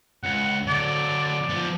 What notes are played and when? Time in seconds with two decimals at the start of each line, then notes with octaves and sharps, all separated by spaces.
0.23 C#2 F#5
0.67 D3 F#3 D5
1.23 D5
1.49 F3 B3